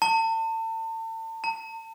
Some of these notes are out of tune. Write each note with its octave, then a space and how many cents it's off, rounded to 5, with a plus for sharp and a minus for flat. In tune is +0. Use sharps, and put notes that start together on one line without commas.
A5 +35
A5 +45